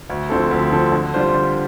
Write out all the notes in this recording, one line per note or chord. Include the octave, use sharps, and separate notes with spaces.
D2
D3 F3 C4 A4
D2
D3 F3 C4 A4
D3
G3 D4 F4 C5
D3